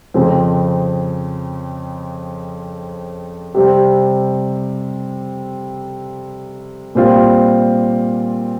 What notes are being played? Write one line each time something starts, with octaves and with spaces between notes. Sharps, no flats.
F2 C#3 F3 C4
C3 G3 C4
A#2 G3 C4 F4